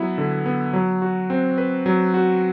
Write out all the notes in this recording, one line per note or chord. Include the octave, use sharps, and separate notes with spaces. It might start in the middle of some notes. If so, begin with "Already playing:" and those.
Already playing: F#3 B3 E4
D3
B3
F#3
F#4
C4
B4
F#3
F#4